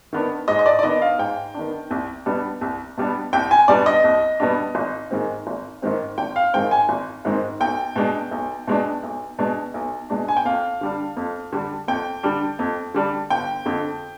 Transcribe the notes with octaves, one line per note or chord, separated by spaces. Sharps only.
D#3 B3 D4
G#2 D#5
D#5
D5
D5
D#3 B3 D4 D#5
F5
G#2 G5
D#3 B3 D4
C2
B2 G3 B3 D4
C2
B2 G3 B3 D4
C2 G5
G#5
B2 G3 B3 D4 D5
D#5
C2
B2 G3 B3 D4
G#1
G#2 D#3 G#3 C4
G#1
G#2 D#3 G#3 C4
G#1 G5
F5
G#2 D#3 G#3 C4 G5
G#5
G#1
G#2 D#3 G#3 C4
B1 G5
B2 G#3 D4
B1
B2 G#3 D4
B1
B2 G#3 D4
B1
B2 G#3 D4
G#5
G5
F2 F5
D3 G3 D4
F2
D3 G3 D4
F2 G5
D3 G3 D4
F2
D3 G3 D4
G1 G5
F2 D3